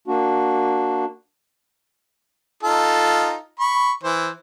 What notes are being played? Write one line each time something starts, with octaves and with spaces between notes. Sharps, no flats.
A#3 D4 F#4
D#4 F4 A4
B5 C#6
E3 C5